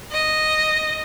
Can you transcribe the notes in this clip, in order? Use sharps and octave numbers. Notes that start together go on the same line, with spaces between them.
D#5